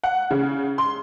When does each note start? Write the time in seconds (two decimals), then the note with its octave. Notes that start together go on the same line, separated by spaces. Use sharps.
0.04 F#5
0.31 C#3
0.78 C6